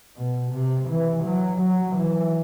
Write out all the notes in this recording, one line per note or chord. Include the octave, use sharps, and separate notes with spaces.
B2
C3
E3
F#3
F#3
E3